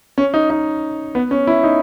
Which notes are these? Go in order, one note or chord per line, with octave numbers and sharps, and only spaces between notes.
C#4
D#4
D#4
B3
C#4
E4
D#4